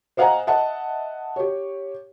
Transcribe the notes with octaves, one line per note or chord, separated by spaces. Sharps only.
C5 D#5 F5 F#5 G#5 A#5
D#5 E5 F#5 A5
G4 C#5